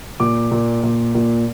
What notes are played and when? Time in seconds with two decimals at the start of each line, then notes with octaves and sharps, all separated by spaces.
0.20 A#2 D6
0.51 A#2
0.83 A#2
1.15 A#2